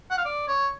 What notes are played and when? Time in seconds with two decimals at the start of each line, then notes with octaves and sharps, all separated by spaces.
0.10 F#5
0.17 F5
0.25 D5
0.48 C#5